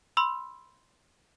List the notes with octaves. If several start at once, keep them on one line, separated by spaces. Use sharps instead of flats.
B5 C6 E6